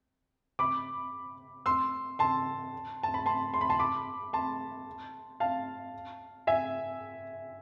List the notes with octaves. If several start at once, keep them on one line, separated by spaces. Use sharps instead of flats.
B5 D6
C6 E6
A5 C6
A5
B5
A5 C6
C6
B5
A5 C6
B5 D6
A5 C6
F5 A5
E5 G#5